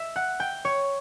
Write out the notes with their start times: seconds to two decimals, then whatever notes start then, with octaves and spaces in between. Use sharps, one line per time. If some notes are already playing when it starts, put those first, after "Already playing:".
Already playing: E5
0.16 F#5
0.40 G5
0.65 C#5